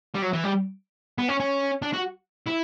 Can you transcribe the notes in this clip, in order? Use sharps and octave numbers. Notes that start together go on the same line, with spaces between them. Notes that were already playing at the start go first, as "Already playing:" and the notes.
G3
F#3
E3
G3
B3
C#4
C#4
D4
F#4
E4